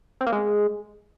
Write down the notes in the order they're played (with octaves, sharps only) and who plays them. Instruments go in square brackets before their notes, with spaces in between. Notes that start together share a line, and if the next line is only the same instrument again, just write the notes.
[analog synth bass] C4
A#3
G#3